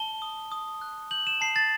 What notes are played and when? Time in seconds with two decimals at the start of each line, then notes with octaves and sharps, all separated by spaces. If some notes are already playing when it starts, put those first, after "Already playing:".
Already playing: A5 G7
0.22 D#6
0.52 D#6
0.82 F#6
1.11 G6 F#7
1.27 E7
1.41 A5 C7
1.56 A6